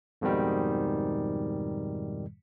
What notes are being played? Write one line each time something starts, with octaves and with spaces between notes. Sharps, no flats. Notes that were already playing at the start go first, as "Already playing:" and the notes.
F2 G#2 B2 D#3 G3